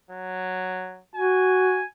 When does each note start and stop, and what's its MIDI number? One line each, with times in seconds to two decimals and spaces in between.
0.11 1.01 54
1.15 1.81 66
1.15 1.85 80